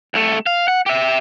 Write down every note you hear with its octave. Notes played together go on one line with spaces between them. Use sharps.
C2 A3
F5
F#5
G4 E5